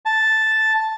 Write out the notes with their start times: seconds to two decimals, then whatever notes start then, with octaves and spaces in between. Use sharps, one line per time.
0.05 A5